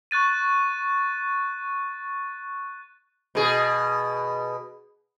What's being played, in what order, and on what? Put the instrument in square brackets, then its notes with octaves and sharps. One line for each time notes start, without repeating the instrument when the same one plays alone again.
[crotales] C#6 F#6 A6 D#7
[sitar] B2 G#4